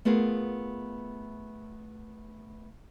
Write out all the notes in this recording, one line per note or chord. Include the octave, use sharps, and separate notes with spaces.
A3 B3 F4 G#4 A#4